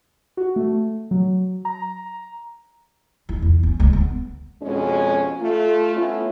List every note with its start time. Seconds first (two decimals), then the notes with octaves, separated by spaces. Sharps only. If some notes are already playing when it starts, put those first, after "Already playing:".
0.37 F#4
0.56 A3
1.11 F#3
1.65 A#5
3.29 E4
3.42 E2
3.63 C#4
3.80 D2 G#3
3.93 B3
4.62 F2 B2 G#3 C#4
5.40 A3 F4
5.96 A3 B3 C#4 E4 F4